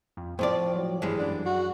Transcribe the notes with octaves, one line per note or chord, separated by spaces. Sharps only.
F2
A2 F3 C4 D5
F#3
G1 G2 E3 G#3
F#2 D4
F#4